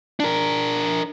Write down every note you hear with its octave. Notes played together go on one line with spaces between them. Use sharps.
D4 A#4